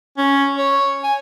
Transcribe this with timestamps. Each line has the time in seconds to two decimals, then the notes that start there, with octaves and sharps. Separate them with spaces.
0.18 C#4
0.58 C#5
1.04 G#5